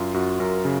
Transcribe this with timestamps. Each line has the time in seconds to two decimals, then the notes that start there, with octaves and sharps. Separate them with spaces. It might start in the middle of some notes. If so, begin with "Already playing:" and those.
Already playing: F#2 F4
0.14 F#2 F#4
0.40 F#2 A#4
0.65 C#3